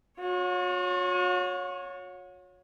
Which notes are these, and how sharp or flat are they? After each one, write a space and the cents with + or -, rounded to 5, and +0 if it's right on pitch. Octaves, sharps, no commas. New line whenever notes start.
F#4 -45 C#5 +0